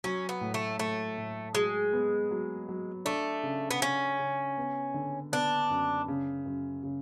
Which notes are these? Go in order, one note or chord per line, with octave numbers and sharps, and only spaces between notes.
F#3 C#4
B3
A2
A3
A2 A3
A2
F#3 G#3
B3
F#3
F#3
A3 D4
C#3
B3
C#3 C#4
C#3
B3
D3
B3 D4
F#2
C#3
F#2
C#3